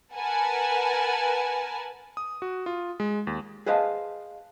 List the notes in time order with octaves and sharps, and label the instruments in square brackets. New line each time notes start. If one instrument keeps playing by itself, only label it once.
[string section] A#4 B4 F#5 G#5 A5
[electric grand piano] D#6
F#4
F4
G#3
D#2
[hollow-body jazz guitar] G#4 B4 C5 D#5 F5 A5